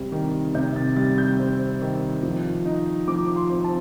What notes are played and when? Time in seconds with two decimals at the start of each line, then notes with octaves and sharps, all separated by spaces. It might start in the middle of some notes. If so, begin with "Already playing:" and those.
Already playing: C3 G3 C4
0.12 D#3
0.55 C3 G6
0.76 A6
0.96 G3 A6
1.18 G6
1.40 C4
1.81 D#3
2.23 F3
2.66 D#4
3.08 F3 D6
3.36 C6
3.50 C4
3.64 A5